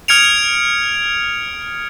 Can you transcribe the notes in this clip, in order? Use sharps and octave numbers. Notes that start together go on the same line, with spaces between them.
D#6 F6 G#6 C#7 D7 F7